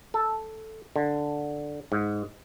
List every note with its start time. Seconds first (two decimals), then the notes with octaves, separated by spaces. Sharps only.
0.14 A4
0.96 D3
1.92 G#2